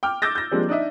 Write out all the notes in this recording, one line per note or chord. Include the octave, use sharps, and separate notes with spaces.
G5 D6 F6
D6 E6 G6 A6 A#6
G6 A#6
F3 G3 G#3 A#3 C4 D4
D4 D#4 D#5 E5